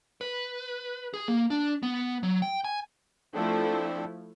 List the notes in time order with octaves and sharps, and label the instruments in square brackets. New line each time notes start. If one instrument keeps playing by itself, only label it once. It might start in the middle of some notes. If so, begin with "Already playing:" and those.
[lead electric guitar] B4
G#4
A#3
D4
B3
F#3
G5
G#5
[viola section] F3 A3 E4 [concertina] C4 D4 A4